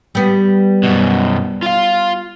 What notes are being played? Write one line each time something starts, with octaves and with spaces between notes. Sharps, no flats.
G3 B3
F#2 B2
F4 F5